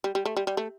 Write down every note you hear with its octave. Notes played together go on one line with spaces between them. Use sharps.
G3
G3
A3
G3
G3
A3